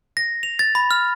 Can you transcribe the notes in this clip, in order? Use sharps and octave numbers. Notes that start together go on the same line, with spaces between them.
A#6
F7
A6
B5
F6